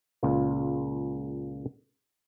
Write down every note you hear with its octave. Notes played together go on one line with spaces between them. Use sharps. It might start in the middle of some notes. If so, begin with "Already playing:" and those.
C#2 A#2 F4